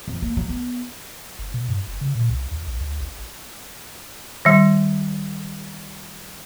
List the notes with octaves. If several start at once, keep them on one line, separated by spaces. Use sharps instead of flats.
F2
A#3
F#3
B3
G1
B2
G2
F#1
C#3
A#2
C2
D#2
A#1
D2
G#1
D#3 G3